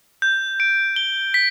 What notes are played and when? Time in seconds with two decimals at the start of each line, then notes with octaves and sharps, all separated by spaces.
0.22 G6
0.60 D7
0.96 G7
1.34 B6